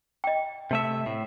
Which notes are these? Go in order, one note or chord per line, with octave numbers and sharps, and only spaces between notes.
D#5 G5
C3 A3 E5
A2